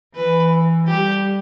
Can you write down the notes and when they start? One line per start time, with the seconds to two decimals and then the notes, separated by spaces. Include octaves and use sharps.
0.15 E3 B4
0.87 G3 G4